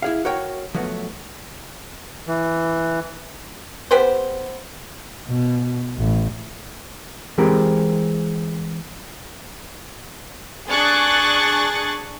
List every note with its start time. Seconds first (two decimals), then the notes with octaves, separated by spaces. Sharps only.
0.02 E4 G#4 F5
0.25 F#4 A#4 C#5 G5
0.75 F3 F#3 A3 B3
2.27 E3
3.91 B3 G4 B4 C5
5.28 B2
5.97 A1
7.38 E3 G#3 C4 G4 G#4 A#4
10.68 D4 G#4 C#6 F#6 A6